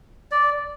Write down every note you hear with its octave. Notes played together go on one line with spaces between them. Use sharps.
D5